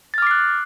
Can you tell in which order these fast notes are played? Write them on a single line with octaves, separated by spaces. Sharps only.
A6 F6 D6 C7 F#6